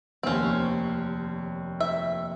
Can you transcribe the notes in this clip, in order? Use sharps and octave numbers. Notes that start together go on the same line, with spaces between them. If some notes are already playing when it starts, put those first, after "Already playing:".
F1 D#2 C4 C#4
E5